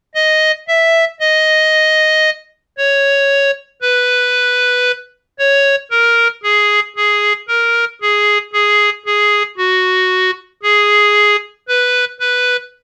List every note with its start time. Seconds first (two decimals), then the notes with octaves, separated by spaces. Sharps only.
0.15 D#5
0.68 E5
1.20 D#5
2.78 C#5
3.81 B4
5.39 C#5
5.91 A#4
6.43 G#4
6.96 G#4
7.48 A#4
8.01 G#4
8.53 G#4
9.06 G#4
9.58 F#4
10.63 G#4
11.68 B4
12.20 B4